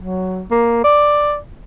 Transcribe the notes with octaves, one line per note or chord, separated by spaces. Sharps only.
F#3
A#3
D5